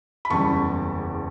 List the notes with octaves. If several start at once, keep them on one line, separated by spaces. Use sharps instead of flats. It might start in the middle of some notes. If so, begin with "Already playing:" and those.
B5
F#1 E2 C#3 G3 A5 C#6